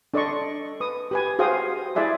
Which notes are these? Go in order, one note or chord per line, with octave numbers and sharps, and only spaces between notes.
D4 A4 D5 D#5 C6 C#6
B4 D#6
G4 B4 G#5
F#4 G#4 C5 F5 G5 D#6
E4 G#4 D5 E5 G#5 C6